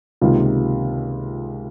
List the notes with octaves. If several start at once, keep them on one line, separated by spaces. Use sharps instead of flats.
C#2 C3 D#3 A#3 F4